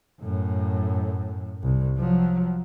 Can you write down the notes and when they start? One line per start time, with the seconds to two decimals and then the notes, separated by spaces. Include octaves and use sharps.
0.22 F#2 A2
1.63 C2
1.97 F3 F#3